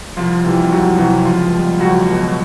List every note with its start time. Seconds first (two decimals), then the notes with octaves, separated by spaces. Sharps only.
0.16 C2 F3 F4
0.44 C3 E3 G3
0.71 C2 F#3 F#4
0.98 C3 E3 F#3 G3 F#4
1.25 C#2 F3 F4
1.53 B2 G3
1.79 C#2 F#3 F#4
2.07 B2 G3